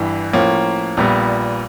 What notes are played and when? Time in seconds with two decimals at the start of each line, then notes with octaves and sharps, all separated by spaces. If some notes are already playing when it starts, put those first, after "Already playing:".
Already playing: G1 G2 E3
0.33 A2 F3 A#3 C#4
0.97 A#1 A#2 G3 B3